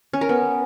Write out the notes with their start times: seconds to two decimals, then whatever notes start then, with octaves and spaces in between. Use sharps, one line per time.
0.13 C#4
0.21 A#4
0.29 B3